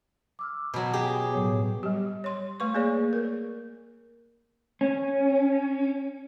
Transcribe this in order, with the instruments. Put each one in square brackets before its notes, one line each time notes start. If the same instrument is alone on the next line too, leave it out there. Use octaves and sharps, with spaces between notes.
[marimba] D6 E6 F6
[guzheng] B2 F#3
G4 G#4
[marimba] B3
A2 F#3 C#5
[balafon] G3 G4
C#5 C6
A3 B4 C#6
A#3 G#4 C#5 D5
A#4
[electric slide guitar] C#4